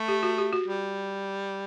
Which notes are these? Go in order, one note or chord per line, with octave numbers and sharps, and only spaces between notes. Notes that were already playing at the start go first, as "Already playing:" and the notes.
Already playing: A3
G4
F#4
G4
F#4
G3